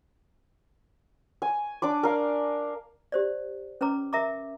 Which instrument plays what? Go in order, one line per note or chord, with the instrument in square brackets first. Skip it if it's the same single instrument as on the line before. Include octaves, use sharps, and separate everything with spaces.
[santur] G#5
D4 D5 D6
A#4 F5
[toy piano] G4 C5 D5
C#4 B4 C#5 A#5 D6
A#4 E5 A#5 D6